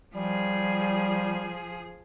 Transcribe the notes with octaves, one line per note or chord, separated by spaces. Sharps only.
F3 G3 G#4